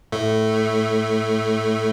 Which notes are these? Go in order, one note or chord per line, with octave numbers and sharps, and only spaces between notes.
A2 A3